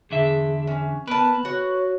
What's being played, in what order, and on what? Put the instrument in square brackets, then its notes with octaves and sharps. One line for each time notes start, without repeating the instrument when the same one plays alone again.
[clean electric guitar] E2 D3 E5 [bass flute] G#4
[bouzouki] C#4
[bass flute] B3 [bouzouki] A#4 A5 [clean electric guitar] B4
[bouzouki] F#4 [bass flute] C#5